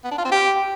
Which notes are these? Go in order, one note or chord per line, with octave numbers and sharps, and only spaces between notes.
B3
D4
F4
C4
G4